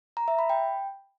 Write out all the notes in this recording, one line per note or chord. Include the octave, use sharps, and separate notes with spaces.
A#5
E5
B5
G5